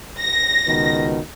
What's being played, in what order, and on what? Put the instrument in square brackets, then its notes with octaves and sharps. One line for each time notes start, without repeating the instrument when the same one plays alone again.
[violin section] A#6
[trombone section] C#2 B2 D#3